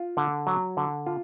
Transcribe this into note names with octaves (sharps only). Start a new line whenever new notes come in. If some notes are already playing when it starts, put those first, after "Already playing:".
Already playing: F4
D3
F#3
D3
F4